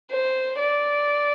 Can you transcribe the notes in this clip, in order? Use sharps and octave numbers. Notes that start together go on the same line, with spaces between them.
C5
D5